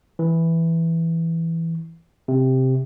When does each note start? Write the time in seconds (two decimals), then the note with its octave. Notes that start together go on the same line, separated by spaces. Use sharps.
0.19 E3
2.28 C3